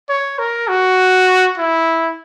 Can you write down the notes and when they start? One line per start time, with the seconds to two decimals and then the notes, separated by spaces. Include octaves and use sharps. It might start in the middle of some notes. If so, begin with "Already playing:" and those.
0.09 C#5
0.39 A#4
0.68 F#4
1.58 E4